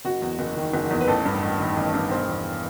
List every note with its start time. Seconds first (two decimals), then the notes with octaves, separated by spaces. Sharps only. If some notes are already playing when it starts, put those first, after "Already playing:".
0.05 F#1 F#4
0.22 E2
0.39 F#1
0.57 D#3
0.74 F#1
0.91 E2
1.01 B4
1.08 A1 A4
1.25 G2
1.42 A1
1.60 D#3
1.77 A1
1.94 G2
2.11 E1 C5
2.28 E2